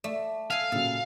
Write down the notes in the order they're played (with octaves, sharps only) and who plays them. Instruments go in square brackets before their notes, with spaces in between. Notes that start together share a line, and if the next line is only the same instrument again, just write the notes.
[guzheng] A3 [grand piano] D5
[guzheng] A4 G#5 [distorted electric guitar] F5
[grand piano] A#2 C#3 F#3 [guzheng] A4